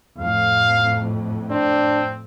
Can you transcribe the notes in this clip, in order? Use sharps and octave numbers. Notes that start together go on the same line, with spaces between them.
F2 A2 F5
C4 D4